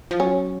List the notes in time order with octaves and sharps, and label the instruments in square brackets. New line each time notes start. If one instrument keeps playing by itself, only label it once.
[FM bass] F3
[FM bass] F#3 [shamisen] C#4